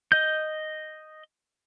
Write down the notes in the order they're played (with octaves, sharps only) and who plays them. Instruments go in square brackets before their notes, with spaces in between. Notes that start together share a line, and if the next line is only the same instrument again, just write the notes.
[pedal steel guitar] D#5 G6